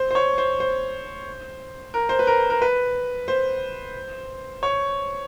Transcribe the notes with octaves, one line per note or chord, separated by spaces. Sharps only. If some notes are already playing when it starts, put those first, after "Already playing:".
Already playing: C5
C5
C#5
C5
C5
A#4
C5
B4
A#4
A#4
B4
C5
C#5